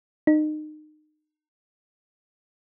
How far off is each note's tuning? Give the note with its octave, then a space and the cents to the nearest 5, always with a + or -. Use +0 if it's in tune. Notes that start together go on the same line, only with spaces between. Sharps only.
D#4 -30